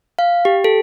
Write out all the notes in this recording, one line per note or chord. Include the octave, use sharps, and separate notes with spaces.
F5
G4
A4